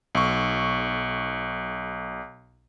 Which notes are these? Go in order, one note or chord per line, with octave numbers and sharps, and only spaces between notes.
B1 C#6